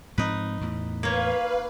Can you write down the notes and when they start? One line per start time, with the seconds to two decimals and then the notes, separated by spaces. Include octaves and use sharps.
0.18 G#2 F3 C4 D#4 B4
0.61 E2 A2
1.03 A#3 B4 C#5 F5